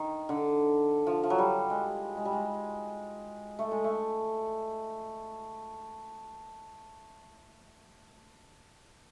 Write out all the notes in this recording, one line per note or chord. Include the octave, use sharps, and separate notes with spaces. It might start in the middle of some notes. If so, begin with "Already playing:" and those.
Already playing: D#3
D3
F3
F3
F#3
G3
G#3
G#3
G3
G#3
A3
G#3
A3